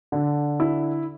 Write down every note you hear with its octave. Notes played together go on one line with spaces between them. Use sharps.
D3
E4